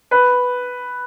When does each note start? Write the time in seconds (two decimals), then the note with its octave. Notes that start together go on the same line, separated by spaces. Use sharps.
0.11 B4